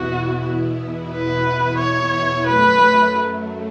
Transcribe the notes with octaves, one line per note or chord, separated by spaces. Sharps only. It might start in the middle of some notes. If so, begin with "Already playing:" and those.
Already playing: E2 B2 B3 E4 F#4
B4
C#5
F#2 F#3 A3 B4